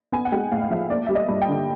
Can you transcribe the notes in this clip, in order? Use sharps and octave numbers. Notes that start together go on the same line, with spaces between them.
B3 G#5
F#5
G#3 G5
A2 F5
F5
F3 E5
A#3 D5
G3 E5
D#5
G2
G5
D3